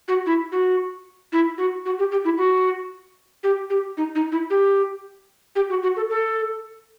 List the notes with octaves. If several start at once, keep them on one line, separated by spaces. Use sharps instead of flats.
F#4
E4
F#4
E4
F#4
F#4
G4
G4
E4
F#4
G4
G4
D#4
D#4
E4
G4
G4
F#4
F#4
A4
A4